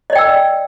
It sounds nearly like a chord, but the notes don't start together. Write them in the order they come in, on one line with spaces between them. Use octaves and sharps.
D#5 D5 G5 E6